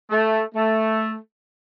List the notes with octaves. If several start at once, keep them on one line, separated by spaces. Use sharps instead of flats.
A3
A3